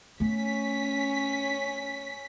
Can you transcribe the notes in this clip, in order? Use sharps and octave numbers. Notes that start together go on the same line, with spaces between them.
A3 B3 C#4 B6